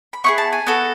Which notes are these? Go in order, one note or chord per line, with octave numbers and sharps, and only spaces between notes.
B5
B3 E4 G#4 C#6
A5
G#5
B3 F#4 A4